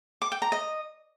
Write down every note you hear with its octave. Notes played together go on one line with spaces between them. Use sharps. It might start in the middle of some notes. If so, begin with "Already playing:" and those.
D6
G5
A#5
D#5